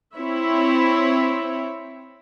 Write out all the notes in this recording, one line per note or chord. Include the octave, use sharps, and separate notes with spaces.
C4 E4 C#5 E5